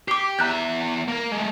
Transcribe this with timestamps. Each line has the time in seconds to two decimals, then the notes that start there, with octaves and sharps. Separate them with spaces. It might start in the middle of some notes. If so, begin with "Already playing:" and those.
0.08 G4 D6 C7
0.39 E2 E5 A#5 F#6 G6
1.08 A#3 A#4
1.31 G#3 A3